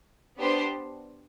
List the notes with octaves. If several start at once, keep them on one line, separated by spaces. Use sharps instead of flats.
B3 D4 G4 C5